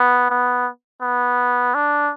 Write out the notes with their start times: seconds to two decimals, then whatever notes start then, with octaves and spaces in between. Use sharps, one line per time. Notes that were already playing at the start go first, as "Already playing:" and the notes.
Already playing: B3
0.30 B3
1.01 B3
1.75 D4